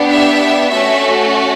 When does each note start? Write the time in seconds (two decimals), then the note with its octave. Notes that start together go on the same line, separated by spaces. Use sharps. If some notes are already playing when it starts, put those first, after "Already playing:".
Already playing: B3 D4 G4
0.10 E5
0.70 A3 C#4 F#4 E5